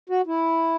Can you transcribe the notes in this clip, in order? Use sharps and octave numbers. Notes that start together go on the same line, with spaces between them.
F#4
E4